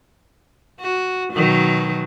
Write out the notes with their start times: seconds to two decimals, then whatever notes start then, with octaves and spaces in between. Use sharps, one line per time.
0.81 F#4
1.34 B2 D#3 F#3